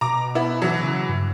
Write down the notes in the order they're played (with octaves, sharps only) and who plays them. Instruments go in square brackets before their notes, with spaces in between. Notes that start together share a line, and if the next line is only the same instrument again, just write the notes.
[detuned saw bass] B2 [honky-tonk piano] A#5 D6
[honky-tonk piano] B3 E4
E3 F#3
[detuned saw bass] C#3
G2